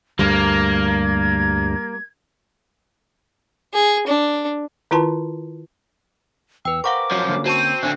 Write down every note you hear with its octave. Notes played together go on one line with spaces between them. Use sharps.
D2 G2 G3 A#3 A#4 G#6
G#4
D4
D#3 E4 F4 B4 A5 C6
E2 B4 G5 E6
A#4 C5 F5 F#5 A#5 C#6 D6
F#2 F3 F#4 C#5
D3 A#3 C#4
C4 F#4 A5 C#6 D#7
D3 C4 G#5